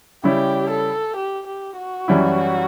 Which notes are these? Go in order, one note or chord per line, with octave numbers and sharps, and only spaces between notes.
C#3 G3 C#4 E4 G4
A4
G4
G4
F#4
F#2 E3 G3 C#4 E4